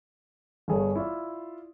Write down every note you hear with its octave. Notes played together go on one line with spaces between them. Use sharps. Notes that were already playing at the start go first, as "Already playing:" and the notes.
G1 G#4 C#5
E4 F4 D5